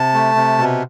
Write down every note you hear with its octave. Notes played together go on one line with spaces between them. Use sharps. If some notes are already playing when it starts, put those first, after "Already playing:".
Already playing: C3 A5
A3
C3
B2